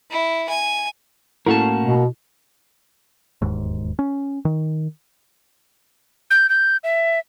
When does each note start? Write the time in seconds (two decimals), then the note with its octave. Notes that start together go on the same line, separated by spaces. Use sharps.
0.11 E4
0.49 G#5
1.46 A2 A#3 C#4 E4 F#4 A4 A#4 A5
1.83 B2
3.42 E1 D#2 G#2
3.99 C#4
4.45 D#3
6.31 G6
6.49 G6
6.84 E5